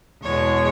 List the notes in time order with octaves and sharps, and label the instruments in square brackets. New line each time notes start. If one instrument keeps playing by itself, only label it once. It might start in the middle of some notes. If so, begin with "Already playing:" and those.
[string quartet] E2 B2 G#3 C#5